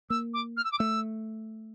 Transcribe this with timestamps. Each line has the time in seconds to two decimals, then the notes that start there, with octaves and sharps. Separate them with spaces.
0.10 A#3 E6
0.34 D6
0.57 F6
0.64 E6
0.72 D6
0.79 A3 E6